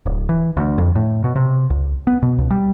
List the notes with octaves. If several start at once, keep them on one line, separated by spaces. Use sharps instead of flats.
D1
E3
D2
F2
A2
B2
C3
C#2
B3
B2
C#2
G3